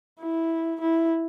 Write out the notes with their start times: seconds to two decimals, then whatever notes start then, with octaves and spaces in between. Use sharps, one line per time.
0.21 E4
0.81 E4